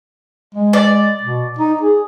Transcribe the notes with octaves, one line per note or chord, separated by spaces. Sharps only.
G#3
D5
B2
D#4
G#4